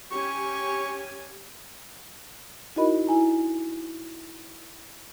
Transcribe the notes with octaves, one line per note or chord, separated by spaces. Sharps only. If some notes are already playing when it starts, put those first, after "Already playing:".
C#4 G4 G#5 C#6
D#4 E4 F#4 A#4 D#5 B5
E4 G#5 A#5